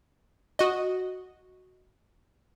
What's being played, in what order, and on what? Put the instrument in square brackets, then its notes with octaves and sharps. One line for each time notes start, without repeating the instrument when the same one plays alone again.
[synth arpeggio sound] F#4 D#5